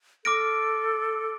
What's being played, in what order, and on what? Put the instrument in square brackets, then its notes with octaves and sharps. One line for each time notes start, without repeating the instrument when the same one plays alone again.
[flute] A4 [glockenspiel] D6 F6 A#6 D7